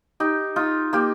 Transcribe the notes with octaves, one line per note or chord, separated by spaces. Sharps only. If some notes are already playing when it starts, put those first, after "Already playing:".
D#4 G4
D#4 F4
A#3 G4